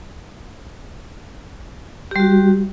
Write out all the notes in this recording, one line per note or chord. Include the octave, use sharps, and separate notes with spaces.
G3 F#4 G4